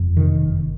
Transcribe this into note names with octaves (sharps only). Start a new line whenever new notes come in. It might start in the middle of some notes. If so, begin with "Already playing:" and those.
Already playing: F#1 F2
C3 D#3
F#1